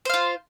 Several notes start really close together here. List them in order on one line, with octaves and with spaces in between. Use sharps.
C5 F5 F4